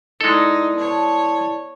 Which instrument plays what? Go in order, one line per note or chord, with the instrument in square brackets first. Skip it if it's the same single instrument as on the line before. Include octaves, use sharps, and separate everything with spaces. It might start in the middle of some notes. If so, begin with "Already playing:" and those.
[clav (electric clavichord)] G#3 A4 [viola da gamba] D#4 [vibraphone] E4 D5
[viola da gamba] B3 C#5 [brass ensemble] A5